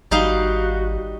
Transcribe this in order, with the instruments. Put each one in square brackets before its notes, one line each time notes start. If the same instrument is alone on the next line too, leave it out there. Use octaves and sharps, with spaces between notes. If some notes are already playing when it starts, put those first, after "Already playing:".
[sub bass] G#1 [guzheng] G3 D#4 F5 [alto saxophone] F#4